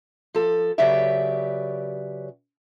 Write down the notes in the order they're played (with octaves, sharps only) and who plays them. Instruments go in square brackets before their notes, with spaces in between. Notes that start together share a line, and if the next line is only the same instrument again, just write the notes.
[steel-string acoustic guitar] F3 A4
C#3 F#3 G4 B4 D5 E5